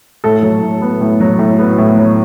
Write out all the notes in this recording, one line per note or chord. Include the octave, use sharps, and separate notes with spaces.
A2 A4
F#3
A2
B3
A2
F#3
A2
B3
A2
F#3